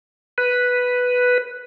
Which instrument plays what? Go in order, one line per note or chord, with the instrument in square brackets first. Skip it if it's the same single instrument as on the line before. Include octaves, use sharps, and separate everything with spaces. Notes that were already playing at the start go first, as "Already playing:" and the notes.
[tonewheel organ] B4